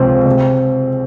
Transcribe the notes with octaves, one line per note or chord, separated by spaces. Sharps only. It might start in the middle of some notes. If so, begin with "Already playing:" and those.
Already playing: C#2 C3 F3 C4
C3